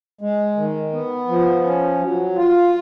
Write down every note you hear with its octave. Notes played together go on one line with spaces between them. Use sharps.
G#3
D#3
B3
F3
C#4
F#3
F4